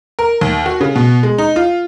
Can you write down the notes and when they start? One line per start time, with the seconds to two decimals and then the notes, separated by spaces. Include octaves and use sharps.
0.19 A#4
0.41 D#2
0.66 F#4
0.81 C#3
0.95 B2
1.23 G#3
1.38 D#4
1.56 F4